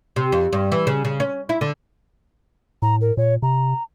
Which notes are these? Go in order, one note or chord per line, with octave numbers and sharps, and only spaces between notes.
C3
F2
G2
E3
C#3
C#3
C#4
E4
D3
A2 A#5
A#4
A#2 C#5
C3 A#5